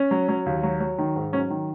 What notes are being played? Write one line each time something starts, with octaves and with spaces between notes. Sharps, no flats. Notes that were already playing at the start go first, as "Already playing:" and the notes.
Already playing: C#4
F#3
F#3
D#2
F#3
F#3
D#3
G#2
F#3 C#4
D#3